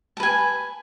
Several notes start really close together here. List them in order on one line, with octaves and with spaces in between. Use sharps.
A5 B4 G#5